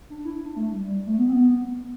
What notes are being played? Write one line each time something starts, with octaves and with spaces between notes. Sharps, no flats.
D4
E4
E4
D4
A3
G3
G3
A3
B3
C4
B3